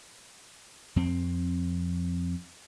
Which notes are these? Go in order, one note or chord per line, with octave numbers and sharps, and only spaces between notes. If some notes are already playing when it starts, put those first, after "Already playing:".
F2 C4